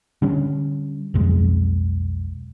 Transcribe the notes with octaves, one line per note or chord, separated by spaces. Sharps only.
D3 G3 C#4
B1 F2 G#3